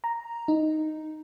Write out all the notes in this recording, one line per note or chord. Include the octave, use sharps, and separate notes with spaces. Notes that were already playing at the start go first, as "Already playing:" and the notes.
A#5
D#4